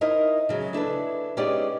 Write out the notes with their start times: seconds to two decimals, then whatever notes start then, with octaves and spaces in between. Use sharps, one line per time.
0.01 D#4 E4 A#4 C5 D#5
0.49 C#3 F#3 G#3
0.73 D4 E4 A4 B4
1.37 G#3 B3 C#4 D#4 G4 D5